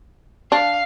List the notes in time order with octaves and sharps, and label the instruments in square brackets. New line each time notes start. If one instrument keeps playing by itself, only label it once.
[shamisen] D4 [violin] F5